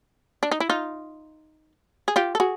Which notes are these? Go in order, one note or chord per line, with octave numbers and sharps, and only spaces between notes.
D4
D#4
E4
D#4 F4
G#4
F4 G4
A4
F#4 G#4